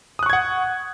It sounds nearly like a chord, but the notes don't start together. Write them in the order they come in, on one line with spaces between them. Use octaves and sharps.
D#6 F#6 C#6 G#6 F#5